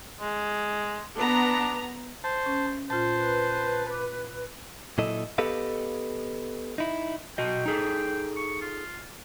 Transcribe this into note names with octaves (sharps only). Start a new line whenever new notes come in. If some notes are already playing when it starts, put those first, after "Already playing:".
G#3
B3 D4 A#5
C5 A5
C#4
A#2 F4 C5 A5
B4
D6
A#2 F#3 E4 A4 D#5
B3 G4 A4 B4 D#5 F5
D#4 E4
B1 F#4 D#5 G5
D#4 G#4 A4
C#6
F4